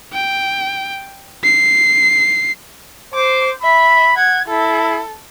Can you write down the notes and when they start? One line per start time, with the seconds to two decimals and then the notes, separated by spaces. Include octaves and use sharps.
0.13 G5
1.44 C7
3.14 C5 D6
3.62 E5 B5
4.17 F#5 G#6
4.48 E4 A4